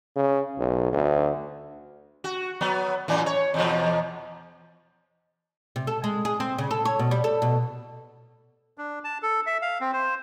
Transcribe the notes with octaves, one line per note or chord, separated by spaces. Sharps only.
C#3
B1
D2
F#4
F#3 B3
F#2 A2 E3
C#5
E2 B2 F3
C3
A4
G#3
G#4
C4
C#3
A4
C#5
B2
G3
A4
B2
D4
A5
A4
E5
F5
C4
C5